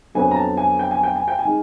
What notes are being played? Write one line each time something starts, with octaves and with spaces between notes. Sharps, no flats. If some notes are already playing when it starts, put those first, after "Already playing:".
F2 D3 F#3 B3 G#5
A#5
A5
G#5
G5
G#5
G5
G#5
G5
G#5
D#3 G#3